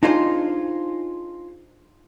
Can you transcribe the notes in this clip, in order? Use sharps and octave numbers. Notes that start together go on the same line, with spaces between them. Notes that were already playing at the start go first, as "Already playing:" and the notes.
D4 D#4 F4 G#4 C5